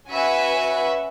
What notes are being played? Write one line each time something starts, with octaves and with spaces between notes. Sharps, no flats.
C#4 F#4 B4 E5 G#5